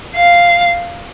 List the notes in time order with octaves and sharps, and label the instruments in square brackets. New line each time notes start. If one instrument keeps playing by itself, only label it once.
[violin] F5